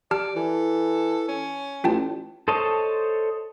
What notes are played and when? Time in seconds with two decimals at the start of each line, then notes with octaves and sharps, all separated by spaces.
0.11 G4 D5 A5 F6
0.36 E3 A4
1.28 C#4
1.84 A1 F4 G5 A5
2.48 A4 C5 C#5 D#5 A5